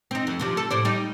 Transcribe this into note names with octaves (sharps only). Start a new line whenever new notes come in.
C4 D#4
F2
C3 F3 D4
A4
A2 C5 D5
G3 D#4